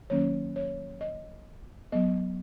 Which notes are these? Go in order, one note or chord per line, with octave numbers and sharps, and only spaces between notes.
D#3 F#3 A#3 C#4 C#5
C#5
D#5
F#3 B3 D#5